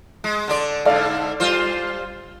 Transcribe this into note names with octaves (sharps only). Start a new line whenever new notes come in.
G#3
D3 D4 D5
G#2 D3 A4 D5 F5
G3 F4 C5